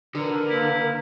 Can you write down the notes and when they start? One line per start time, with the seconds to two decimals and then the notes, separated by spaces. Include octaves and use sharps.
0.15 D3 A#4 B4
0.49 A#3 E4